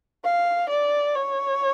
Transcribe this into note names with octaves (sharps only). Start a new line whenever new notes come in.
F5
D5
C#5